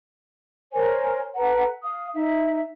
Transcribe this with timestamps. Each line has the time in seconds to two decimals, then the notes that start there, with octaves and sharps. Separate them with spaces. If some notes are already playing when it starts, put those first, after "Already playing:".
0.73 A#4 C5 C#5 G#5
1.35 A4 B4 F#5 A#5
1.83 F5 D#6
2.14 D#4 E5